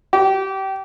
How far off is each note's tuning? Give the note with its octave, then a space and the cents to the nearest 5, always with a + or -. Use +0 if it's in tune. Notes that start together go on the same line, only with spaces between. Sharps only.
G4 -25